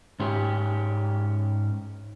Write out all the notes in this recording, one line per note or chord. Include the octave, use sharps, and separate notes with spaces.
G#2 C#4 G4